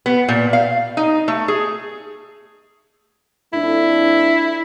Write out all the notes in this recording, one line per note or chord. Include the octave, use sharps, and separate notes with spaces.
B3
A#2
F5
D#4
A3
G#4
F2 A3 D4 E4